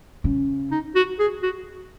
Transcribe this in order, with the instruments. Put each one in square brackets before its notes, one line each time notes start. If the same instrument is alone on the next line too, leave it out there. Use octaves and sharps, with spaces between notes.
[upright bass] C#3
[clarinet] D#4
F#4
G#4
F#4